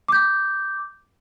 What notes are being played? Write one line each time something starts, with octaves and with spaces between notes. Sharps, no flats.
D6 G6